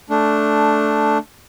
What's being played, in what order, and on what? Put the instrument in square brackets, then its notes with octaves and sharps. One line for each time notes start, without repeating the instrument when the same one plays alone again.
[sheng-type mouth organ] A3 D4